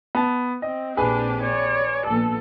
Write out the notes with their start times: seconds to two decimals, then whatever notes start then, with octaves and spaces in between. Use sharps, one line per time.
0.15 B3 A5
0.62 C4 D#5
0.97 A#1 C4 D4 G4 G#4 B4 G#5
1.42 C#5 D5
2.06 A#1 A#2 B3 A4